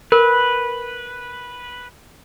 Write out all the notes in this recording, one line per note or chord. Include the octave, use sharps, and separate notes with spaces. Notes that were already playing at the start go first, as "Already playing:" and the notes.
A#4 B4